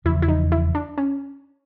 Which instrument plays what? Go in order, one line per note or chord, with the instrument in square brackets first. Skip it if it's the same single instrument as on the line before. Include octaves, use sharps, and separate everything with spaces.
[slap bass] F1 E2 C#3 F3 [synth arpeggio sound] E4
[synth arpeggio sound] E4
D#4
E4
D4
C#4